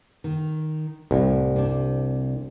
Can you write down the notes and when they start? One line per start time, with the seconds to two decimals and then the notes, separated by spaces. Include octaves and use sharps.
0.24 D#3
1.11 C2 A2
1.56 C3 D4